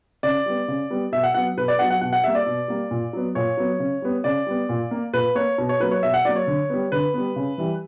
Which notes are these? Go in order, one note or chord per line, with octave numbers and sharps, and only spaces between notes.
C#3 D5
G3 B3
C#3
G3 B3
B2 E5
F#5
F#3 B3 F#5
B2 B4
D5
F#3 B3 F#5
F#5
B2 F#5
F#5
G3 A#3 E5
D5
B2
G3 A#3
A#2
F#3 B3
A#2 C#5
F#3 B3
C#3
G3 B3
C#3 D5
G3 B3
A#2
A#3
A#2 B4
A#3 C#5
B2
C#5
F#3 A#3 B4
C#5
B2 E5
F#5
F#3 A#3 D5
C#5
D3
G3 B3
D3 B4
G3 B3
C#3
E3 G3